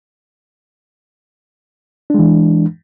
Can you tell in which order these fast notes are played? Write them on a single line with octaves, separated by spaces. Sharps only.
D4 G#3 E3